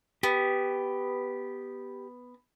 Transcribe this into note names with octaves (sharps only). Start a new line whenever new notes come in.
B3 G4